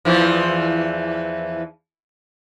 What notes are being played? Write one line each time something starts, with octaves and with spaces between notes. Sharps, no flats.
E2 E3 F3